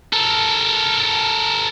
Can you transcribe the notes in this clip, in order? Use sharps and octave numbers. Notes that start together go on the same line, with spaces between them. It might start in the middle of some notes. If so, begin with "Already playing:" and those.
A4 A#4